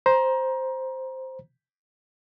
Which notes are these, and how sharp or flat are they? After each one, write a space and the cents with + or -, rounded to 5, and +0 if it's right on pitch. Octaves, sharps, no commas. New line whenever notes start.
C5 +0 A#5 +25